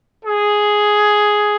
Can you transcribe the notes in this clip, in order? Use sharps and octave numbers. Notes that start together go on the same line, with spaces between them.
G#4